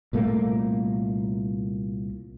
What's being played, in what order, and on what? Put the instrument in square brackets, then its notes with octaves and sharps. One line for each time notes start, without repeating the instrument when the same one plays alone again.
[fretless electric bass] C2 A#2 A3 A#3